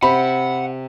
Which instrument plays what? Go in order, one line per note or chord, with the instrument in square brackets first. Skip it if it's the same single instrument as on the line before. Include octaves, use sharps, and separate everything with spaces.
[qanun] C3 [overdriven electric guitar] F#5 [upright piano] B5